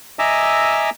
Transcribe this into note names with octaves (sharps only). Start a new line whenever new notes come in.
D#5 E5 G#5 A#5 D6 E6